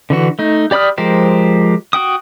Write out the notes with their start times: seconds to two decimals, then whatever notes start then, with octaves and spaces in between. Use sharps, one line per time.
0.10 D3 E3 F#4
0.39 A3 D#4
0.71 G4 D5 B5 D#6 F6
0.98 F3 G#3 G4 A#4 C5
1.93 F#4 G5 D#6